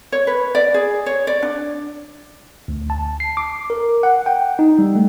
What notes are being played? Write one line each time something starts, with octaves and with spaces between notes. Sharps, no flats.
C#5
B4
D5
G#4
C#5
D5
D4
D2
A5
C7
D6
A#4
F#5
G5
D#4
G3
A3